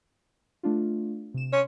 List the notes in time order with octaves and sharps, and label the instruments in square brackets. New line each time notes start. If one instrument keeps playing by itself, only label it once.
[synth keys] A3 D4 F4
C3 E7
[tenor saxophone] C#4 [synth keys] C6